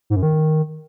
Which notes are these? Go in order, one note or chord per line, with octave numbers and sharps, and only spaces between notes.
G#2
F#2
D#3